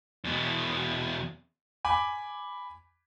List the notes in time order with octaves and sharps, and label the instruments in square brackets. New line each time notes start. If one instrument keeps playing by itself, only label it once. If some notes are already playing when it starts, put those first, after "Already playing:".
[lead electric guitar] E2 B2
[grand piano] G#5 B5 D6